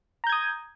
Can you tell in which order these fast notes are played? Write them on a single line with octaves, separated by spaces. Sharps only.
A#5 G6 G#6 D#6